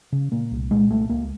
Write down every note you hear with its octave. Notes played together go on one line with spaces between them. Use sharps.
C#3
A#2 A#3
C2
A#2 G#3
C2 A3
C#2 A#3